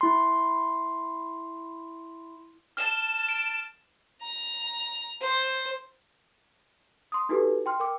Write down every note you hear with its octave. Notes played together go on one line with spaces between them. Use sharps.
E4 C6
A5 F6 E7
D7
A#5
C5
C6 D#6
D#4 E4 F#4 G4 A4 B4
G5 C6 F6
A#4 G5 D6